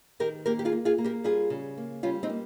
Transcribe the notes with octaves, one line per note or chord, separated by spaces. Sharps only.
D#3 G4 A#4
A#3 G4 A#4
G4
F4 G#4
A#3
F4 G#4
A#3
G4 A#4
G3 F4 G#4
C#3
A#3
G3 C#4 F4
C4 D#4
A#3